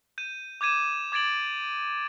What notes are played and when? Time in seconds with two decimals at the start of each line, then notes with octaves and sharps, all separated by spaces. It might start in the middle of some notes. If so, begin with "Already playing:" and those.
0.18 G6 D#7
0.61 D6 G6 G#6 D#7 E7
1.12 D6 G#6 A6 D7 F#7